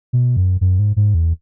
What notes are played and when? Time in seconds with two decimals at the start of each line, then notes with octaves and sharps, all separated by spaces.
0.13 B2
0.37 F#2
0.61 F#2
0.79 G#2
0.96 G#2
1.14 E2